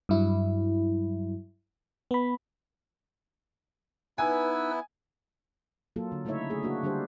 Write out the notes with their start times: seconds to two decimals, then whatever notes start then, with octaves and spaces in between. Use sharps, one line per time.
0.09 G2 F#3 E4
2.11 B3 B5
4.18 B3 D#4 E4 B4 G#5 E6
5.96 F#3 A#3 F4 A4
6.12 D3
6.25 C#3 A3 D#4 E4 C#5 E5
6.50 A3 G#4
6.63 A#3 D4 F#4
6.83 D3 G3 D4 G4 A4 C5